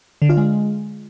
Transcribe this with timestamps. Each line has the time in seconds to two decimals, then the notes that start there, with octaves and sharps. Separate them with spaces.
0.22 D3
0.29 F4
0.37 G#3